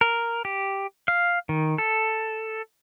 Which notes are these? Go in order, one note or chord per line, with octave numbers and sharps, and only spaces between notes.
A#4
G4
F5
D#3
A4